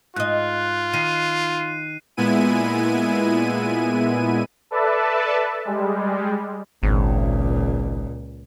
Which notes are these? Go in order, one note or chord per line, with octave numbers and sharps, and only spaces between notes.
G#2 F4 D#5 F#6
D#3 C7 D#7
A#2 G#3 B3 E4 G#5 D#7
A4 B4 D5 E5 A5
G3 G#3
G#1 C#2 A#2